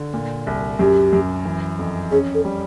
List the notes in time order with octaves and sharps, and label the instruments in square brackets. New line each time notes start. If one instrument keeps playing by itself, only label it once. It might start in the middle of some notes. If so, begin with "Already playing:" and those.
Already playing: [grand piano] D3
A#2
C2
[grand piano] F#2 [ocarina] G4
[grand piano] F#2
E3
F2
[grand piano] C#4 [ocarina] G#4
[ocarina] A4
[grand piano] G3